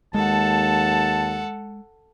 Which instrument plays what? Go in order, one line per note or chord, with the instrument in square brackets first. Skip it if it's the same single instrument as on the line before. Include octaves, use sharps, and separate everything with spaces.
[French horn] D#2 [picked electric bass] G#3 [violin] A4 F#5 [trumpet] A5